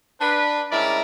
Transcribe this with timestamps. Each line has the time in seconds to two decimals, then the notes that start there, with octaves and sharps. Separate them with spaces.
0.21 D4 B4
0.70 G2 G#3 C#4 E4 A#4 D5